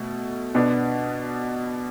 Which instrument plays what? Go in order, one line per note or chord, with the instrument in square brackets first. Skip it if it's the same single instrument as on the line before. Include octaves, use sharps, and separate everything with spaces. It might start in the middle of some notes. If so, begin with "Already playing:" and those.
Already playing: [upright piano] B2 A3
B2 B3 D4